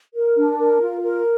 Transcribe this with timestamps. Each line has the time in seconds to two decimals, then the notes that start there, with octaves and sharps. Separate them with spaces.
0.15 A#4
0.37 D4
0.59 A#4
0.81 F4
1.03 A#4